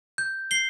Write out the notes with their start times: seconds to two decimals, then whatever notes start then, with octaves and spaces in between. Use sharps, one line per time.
0.18 G6
0.51 C7 G7